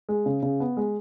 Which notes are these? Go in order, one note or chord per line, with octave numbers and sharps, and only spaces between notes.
G#3
C#3
C#3
B3
G#3